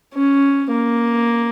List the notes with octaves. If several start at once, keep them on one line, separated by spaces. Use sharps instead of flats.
C#4
A#3